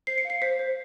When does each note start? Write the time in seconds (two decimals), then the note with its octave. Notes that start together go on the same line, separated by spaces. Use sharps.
0.07 C5 C7
0.18 C#7
0.25 F5
0.30 C7
0.42 C5 B6
0.59 C5